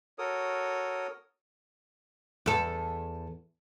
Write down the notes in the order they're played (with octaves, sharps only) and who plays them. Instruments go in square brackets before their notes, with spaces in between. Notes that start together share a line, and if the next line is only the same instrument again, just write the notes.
[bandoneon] F#4 A4 A#4 C#5 D#6
[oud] E2 A4